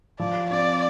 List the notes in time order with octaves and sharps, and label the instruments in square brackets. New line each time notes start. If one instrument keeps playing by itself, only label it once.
[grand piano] F3 [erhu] D5
[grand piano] C4 [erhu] D5